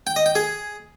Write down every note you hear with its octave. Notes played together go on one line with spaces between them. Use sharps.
G5
D#5
G5
G#4